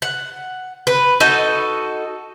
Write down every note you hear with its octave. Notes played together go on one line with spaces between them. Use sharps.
F#5
B4
D#4 F#4 A4 D#5